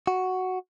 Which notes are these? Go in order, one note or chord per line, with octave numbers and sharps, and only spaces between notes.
F#4